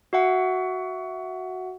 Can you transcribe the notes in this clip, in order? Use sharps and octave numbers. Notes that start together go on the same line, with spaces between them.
F#4 E5 F#5